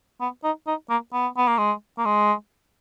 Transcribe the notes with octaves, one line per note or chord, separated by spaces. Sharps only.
B3
D#4
D#4
A#3
B3
B3
A#3
G#3
A#3
G#3